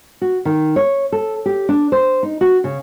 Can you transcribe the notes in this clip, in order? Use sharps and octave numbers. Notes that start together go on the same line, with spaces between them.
F#4
D#3
C#5
A4
G4
D4
C5
D#4
F#4
C#3